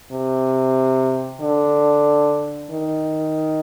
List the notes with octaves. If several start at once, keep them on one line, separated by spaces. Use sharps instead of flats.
C3
D3
D#3